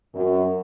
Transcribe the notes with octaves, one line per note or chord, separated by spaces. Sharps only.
F#2